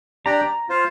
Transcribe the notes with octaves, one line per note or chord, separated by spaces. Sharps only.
D4 G4 D5 G5 A#5
F4 C5 F5